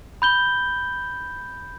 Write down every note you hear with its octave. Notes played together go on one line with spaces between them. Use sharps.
B5 G6 G7